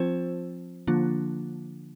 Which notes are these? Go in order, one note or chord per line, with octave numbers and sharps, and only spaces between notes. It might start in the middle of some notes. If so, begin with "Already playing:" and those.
Already playing: F3 C4 F4 C5
D3 F3 A#3 D4 F4